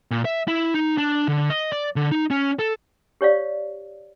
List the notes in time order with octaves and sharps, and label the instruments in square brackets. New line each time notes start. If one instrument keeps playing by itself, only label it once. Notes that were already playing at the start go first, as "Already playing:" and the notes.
[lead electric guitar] A#2
E5
E4
D#4
D4
D3
D#5
D5
D3
D#4
C#4
A4
[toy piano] G4 C#5 D5 F5